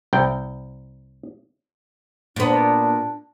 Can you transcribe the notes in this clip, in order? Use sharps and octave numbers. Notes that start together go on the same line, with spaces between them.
C2 G5
A#2 B3 D4